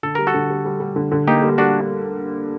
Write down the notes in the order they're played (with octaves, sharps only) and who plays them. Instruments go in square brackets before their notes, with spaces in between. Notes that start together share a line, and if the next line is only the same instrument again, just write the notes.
[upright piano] D3 [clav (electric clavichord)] A4
[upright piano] G3 [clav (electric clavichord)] A#4
[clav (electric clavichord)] F#4 A4
[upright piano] D3
G3
G3
G3
D3
D3
[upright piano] A#3 [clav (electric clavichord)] D#4 G4
[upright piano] G3
[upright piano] G3 [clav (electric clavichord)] D4 F#4